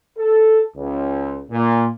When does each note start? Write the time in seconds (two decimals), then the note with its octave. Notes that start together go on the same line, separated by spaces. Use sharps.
0.18 A4
0.77 C#2
1.51 A#2